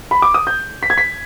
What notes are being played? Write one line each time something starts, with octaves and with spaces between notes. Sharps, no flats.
B5
D6
D#6
G6
B6
G#6
B6